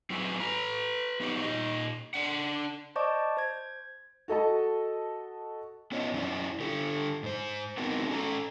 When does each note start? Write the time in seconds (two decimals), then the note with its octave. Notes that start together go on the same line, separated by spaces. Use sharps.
0.10 F#3 C4 E4 G#4 B4 G#5
0.40 B4 A#5
1.20 F3 B3 D#4 F#4 G4 C#5
1.42 A#2 D#4 D#5
2.14 D4 F#5
2.96 C5 D5 D#5 A5 C#6 D6
3.37 C5 G#6
4.28 F#4 A4 D#5 A5
5.92 B3 C#4 F4 C#5 D#5
6.13 F#2 F#3 C#4 E4 D5
6.60 D3 G4 A4
7.23 G#2 C5
7.78 B3 C4 D#4 F#4 A#4
8.09 C#4 A4 A#5